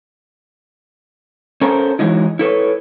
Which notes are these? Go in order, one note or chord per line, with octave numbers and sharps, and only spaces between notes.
C#4 A4 A#4 C5
E3 F#3 G#3 D#4 E4
E4 A4 B4 C#5